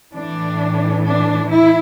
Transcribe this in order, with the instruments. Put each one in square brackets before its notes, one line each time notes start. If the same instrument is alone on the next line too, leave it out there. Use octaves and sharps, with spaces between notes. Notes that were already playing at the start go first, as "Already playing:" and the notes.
[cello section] A2 E3 D4
D4
E4